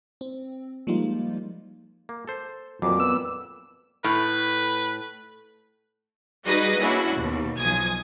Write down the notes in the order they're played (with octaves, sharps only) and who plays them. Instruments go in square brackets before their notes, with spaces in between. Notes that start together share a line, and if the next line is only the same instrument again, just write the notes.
[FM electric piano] C4
F3 G3 G#3 A#3 D#4 F4
[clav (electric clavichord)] A#3
A4 C5
[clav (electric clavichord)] F2 A#2 [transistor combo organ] F#3 [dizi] D6
[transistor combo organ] B3 E6
[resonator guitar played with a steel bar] A2 [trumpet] B4
[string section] G3 D#4 F#4 G#4 B4 D#5
A#3 C#4 D4 E4 F#4
D#2 B2
B1 F3 G#5 D#6 G#6